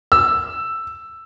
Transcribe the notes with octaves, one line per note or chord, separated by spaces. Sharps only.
E6